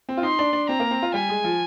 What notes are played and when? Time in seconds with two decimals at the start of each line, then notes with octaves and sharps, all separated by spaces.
0.09 C4
0.17 F4
0.23 D#4 C6
0.39 D4
0.53 D4
0.69 C4 A#5
0.80 A#3
0.91 C4
1.02 F4
1.14 G3 G#5
1.29 G#3
1.44 F3